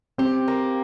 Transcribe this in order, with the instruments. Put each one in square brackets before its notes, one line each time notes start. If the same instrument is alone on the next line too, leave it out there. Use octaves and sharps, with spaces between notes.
[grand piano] C4 [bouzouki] G4
[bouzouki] A#3